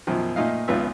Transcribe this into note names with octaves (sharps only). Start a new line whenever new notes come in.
F#2 B2 D#3 F3
A#2 A3 D#4 F5
G#1 C#2 B3 F4 E5